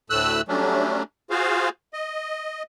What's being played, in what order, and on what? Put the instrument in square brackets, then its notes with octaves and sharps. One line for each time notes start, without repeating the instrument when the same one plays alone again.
[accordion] D2 A2 A3 E6 F#6
F#3 G3 A3 C#4 D4
F4 F#4 G#4 C5 F5
D#5